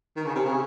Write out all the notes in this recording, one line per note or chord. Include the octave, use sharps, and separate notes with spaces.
D#3
C#3
C3
C#3